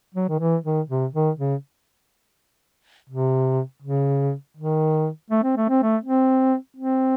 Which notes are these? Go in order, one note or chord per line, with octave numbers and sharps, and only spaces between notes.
F#3
D#3
E3
D#3
C3
D#3
C#3
C3
C#3
D#3
A3
C4
A3
C4
A3
C4
C4